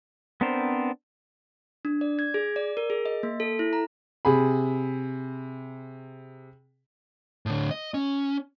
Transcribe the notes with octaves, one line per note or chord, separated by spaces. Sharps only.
B3 C4 D4 A#4 C5
D4
D5
G#6
G#4
D5
A#4
G#4
D#5
A#3
A4
E4
A#5
C3 G#4 B5
A2 D3
D#5
C#4